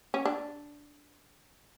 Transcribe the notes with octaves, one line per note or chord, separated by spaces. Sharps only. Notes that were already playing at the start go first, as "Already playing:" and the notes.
C#4
D4